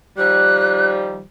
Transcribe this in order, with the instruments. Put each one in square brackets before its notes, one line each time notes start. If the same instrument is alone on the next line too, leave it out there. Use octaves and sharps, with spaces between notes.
[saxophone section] D#3 F3 G3 [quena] F#6